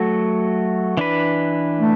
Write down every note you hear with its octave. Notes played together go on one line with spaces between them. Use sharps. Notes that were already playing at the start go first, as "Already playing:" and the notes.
Already playing: F#3 A3 F#4 A4
E3 D4 B4
A3